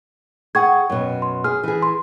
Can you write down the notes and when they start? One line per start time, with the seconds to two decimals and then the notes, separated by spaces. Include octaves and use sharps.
0.55 G#4 F#5 G5 C#6 G#6
0.90 F#2 B2
1.22 C6
1.44 G#4 F6
1.63 E3 G#4
1.83 C6